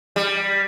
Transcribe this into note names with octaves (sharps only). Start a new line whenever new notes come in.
G3